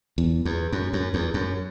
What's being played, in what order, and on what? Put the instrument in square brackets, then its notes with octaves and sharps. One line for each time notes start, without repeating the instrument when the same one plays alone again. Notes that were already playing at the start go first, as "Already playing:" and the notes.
[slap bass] E2
E2
F#2
F#2
E2
F#2